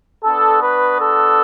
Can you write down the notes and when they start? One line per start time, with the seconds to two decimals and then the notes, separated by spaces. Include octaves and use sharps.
0.24 B3 D4 F#4 A4
0.62 B4
0.99 A4